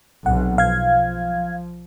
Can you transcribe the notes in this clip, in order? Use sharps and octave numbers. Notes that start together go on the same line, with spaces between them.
B1 C3 F#5
F3 F5 G#6